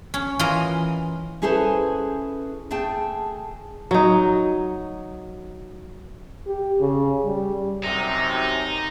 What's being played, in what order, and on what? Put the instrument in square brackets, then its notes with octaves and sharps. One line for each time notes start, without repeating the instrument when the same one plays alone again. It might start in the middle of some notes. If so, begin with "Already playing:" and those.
[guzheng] C#4
E3 F4 A#4 D#5 A#5
[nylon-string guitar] C#4 E4 G#4 A4 B4 C5
A3 G#4 G5 A5
[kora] F#3 D#4
[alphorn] G4
C#3
G3
[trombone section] F#2 C3 [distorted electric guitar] D#4